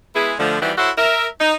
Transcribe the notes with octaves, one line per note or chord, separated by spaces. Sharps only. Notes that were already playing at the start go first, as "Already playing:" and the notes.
G#3 B3 E4 G#4
D3 F3 A3
D#3 E3 G3 C4 F#4
E4 F#4 A4 C5 C#5 E5
A#4 E5
D#4